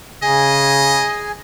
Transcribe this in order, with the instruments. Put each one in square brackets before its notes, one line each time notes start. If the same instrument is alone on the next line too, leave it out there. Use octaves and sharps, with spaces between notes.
[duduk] C#3 [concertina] G#4 G#5 [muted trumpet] D#5